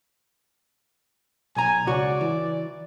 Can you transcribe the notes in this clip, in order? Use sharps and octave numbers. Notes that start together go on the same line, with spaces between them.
B1 G#5 A#5
C#2 F#4 C#5 D5
E3